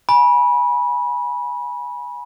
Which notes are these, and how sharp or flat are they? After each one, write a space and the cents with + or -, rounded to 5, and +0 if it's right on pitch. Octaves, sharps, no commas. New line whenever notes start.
G#5 +0 B5 -25